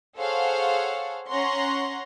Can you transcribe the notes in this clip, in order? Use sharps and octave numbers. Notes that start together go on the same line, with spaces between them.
G#4 A4 C5 C#5 F5 F#5
C#4 F#5 A#5 C6 C#6